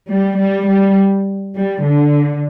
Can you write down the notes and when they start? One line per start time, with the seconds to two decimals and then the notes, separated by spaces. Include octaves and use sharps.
0.10 G3
0.40 G3
0.69 G3
1.57 G3
1.85 D3